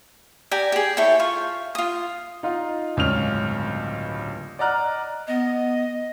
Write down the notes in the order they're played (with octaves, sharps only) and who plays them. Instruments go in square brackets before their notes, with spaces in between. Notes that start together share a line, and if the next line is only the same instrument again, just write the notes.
[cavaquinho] G4 D5 G#5 A#5
G4 G#4
E4 A4 C#5 G5
F4 C#6
F4 D#6
[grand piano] D#4 F4 F5
D1 C#2 G2 C#4 F6 F7
D5 D#5 F#5 A#5 F6 F#6
[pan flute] B3 [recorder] D#5